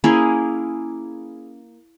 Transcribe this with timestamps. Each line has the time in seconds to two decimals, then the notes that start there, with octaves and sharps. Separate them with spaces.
0.04 A#3 C#4 E4 G#4